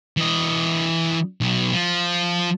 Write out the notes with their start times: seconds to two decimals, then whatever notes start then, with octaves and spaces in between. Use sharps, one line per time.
0.17 E3 D#5
1.41 B1 B2
1.72 F3